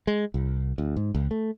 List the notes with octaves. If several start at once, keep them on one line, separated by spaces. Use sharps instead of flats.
G#3
C2
D2
G#2
C#2
A3